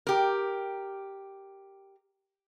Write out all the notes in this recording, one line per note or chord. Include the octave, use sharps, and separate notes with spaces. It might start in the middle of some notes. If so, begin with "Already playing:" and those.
G4 A#4